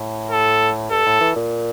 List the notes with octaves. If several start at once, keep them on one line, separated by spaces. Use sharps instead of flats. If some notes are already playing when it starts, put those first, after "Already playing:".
Already playing: A2
A4
G2 A4
A2
E3
A#2